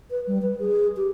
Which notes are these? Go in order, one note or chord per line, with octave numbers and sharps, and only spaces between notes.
B4
G3
B4
G#4
G4